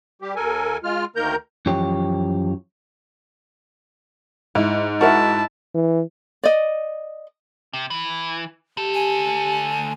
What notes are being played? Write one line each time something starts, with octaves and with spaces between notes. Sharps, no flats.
G3 G4
D#2 A4 A#4 G#5
G#3 F4 F6
D2 D#3 A#3 A#4 A#5 G6
F#2 E3 F3 G4 C#5
G#2 E4
E4 F#4 A#4 E5 A5
E3
D5 D#5
C3
E3
D2 G4 A4
G#5